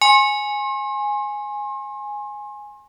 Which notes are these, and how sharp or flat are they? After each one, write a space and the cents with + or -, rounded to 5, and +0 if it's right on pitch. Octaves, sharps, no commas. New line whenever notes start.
G#5 +0 C6 +40